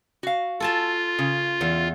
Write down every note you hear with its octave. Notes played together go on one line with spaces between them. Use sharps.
F#4 F5
F4 A4 G#5 A5
C#3
E2